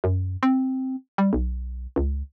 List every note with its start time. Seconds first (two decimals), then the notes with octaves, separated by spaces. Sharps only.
0.04 F#2
0.43 C4
1.18 G3
1.33 B1
1.96 C#2